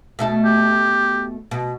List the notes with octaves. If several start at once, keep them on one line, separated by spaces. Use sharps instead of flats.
B2 A3 A4
G4
B2